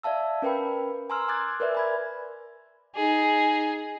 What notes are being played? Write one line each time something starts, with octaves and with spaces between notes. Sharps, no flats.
D5 E5 F5 A5 E6
C#4 A#4 B4 G5 B5
G#5 A#5 C6 E6 F6
G#5 C6 D6 F#6 G#6 A6
A#4 B4 D5 E5
G#5 B5 G#6
D#4 G#4